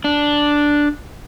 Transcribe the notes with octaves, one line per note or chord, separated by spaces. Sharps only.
D4